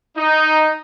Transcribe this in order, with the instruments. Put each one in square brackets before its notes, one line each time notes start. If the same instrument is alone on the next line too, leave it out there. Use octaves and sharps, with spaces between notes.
[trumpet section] D#4